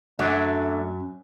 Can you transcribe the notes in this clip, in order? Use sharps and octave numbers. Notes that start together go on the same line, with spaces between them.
F#2 F#3 A3 D4